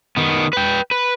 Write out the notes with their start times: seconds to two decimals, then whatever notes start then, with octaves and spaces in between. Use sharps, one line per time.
0.17 D#3 B3
0.53 B4 G5
0.91 B4